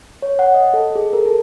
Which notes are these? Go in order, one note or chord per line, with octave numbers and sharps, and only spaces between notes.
C#5
F#5
D#5
A4
G#4
A#4
A4